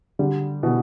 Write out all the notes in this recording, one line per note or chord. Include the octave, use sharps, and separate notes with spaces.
D3 G3
B2 E3